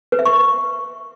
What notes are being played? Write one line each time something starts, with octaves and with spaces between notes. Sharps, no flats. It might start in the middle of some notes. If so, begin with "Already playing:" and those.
B4
E5
C#6